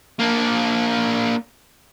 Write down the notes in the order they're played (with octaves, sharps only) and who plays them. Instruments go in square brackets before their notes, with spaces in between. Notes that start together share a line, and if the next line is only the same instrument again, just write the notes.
[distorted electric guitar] A#3 D4